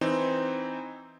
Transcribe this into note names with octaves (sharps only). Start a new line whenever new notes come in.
E3 C4 D#4